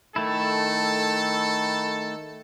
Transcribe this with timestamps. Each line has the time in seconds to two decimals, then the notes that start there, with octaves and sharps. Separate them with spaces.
0.16 D#3 A3 E4 A4